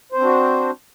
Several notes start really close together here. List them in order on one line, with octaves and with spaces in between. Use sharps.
C5 C4 D4 F#4